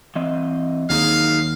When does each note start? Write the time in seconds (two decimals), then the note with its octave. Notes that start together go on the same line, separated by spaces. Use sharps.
0.16 E3 C4 D#5
0.90 D#2 F#3 D#4 G#4 F5